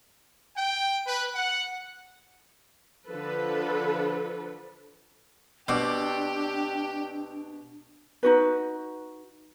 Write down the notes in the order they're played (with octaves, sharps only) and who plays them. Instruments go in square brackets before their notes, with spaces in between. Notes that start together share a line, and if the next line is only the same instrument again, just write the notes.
[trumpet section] G5
B4
F#5
[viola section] D3 F3 A4 B4
[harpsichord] B2 [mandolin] C4 D5 [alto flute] D4 [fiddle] G4 G5
[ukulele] D#4 F#4 B4